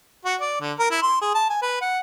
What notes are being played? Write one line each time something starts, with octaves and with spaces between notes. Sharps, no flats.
F#4
D5
D3
A#4
E4
C6
G#4
A5
G#5
B4
F#5